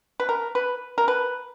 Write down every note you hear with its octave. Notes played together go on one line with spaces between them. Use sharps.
B4
A#4
B4
A#4
B4